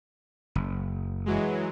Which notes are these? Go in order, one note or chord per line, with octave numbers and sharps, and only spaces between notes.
F#1
E3 F#3 G#3